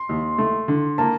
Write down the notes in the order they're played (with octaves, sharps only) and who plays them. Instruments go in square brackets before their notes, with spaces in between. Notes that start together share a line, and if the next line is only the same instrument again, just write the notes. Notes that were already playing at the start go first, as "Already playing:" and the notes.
Already playing: [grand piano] C6
[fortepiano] D#2
A3
D3
[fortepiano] A#3 [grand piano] A5